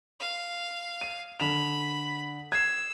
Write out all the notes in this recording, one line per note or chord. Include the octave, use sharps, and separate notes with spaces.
F5
D#7
D3 B5 E7 F7
E6 G#6 C7